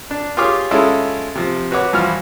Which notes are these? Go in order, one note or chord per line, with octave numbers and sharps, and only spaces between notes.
D4
F4 G4 G#4 C#5 D6 F6
G#3 C#4 E4 F4 A4
C3 F3
F#4 B4 C#5 F#5 D6
G2 E3 F3 F4 F#4 F6